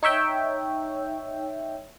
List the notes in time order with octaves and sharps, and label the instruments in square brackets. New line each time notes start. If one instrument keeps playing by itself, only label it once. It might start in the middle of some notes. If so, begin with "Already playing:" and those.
[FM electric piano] D#4 C#5 E5 G5